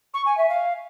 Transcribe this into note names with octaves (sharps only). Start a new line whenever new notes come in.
C#6
G#5
E5
F5